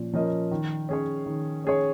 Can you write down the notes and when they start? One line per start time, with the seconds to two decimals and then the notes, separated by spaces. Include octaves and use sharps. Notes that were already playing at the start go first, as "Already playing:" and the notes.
Already playing: A#2 F3 C#4
0.13 F3 C#4 A#4 D#5
0.51 D#3
0.89 C#4 G#4 C#5
1.26 D#3
1.64 C#4 G#4 C#5